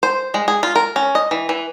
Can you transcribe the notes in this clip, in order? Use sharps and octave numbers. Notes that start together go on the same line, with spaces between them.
C5
G#3
G#4
F4
A#4
C#4
D#5
E3
E3